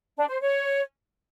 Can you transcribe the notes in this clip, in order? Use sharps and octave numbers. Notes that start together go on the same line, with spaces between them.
D4
C5
C#5